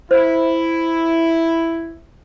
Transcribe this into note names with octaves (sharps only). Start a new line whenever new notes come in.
E4 C5